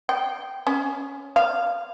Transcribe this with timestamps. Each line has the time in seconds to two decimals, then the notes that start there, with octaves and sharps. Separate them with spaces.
0.09 G5
0.67 C#4
1.36 F5